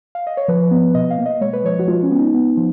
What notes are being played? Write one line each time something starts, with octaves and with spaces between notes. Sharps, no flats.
F5
D#5
C#5
F3 B4
B3
B2 D#5
F5
A#3
D#5
G#3 C#5
B4
F3 C#5
F#4
G#3 F4
C#4
B3
D#4
B3
F3